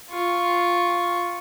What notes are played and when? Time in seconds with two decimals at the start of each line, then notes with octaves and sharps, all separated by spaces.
0.10 F4 C#6